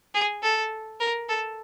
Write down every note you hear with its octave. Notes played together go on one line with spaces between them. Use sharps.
G#4
A4
A#4
A4